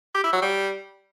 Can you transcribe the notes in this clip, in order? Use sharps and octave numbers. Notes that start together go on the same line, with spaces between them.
G4
E4
F#3
G3